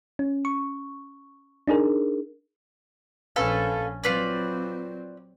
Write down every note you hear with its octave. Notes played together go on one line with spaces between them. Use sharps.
C#4
C#6
D4 D#4 G#4 A#4
A#1 C#4 A4 B4 F5
F#3 C4 F4 B4 D5